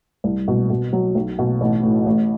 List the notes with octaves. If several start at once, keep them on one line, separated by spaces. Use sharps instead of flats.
C2
B2
B2
F#3
B1
B2
A1
A2
A1